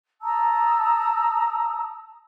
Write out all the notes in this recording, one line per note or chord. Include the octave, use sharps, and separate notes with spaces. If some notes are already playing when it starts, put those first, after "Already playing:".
A5 A#5 D#6 E6